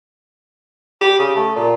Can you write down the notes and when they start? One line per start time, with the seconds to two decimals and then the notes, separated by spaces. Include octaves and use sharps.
1.01 G4
1.19 C#3
1.36 A3
1.56 A#2